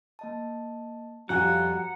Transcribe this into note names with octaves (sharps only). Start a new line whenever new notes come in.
A#3 D#5 A5
F2 G3 F4 F#4 F#5 G#5 A#5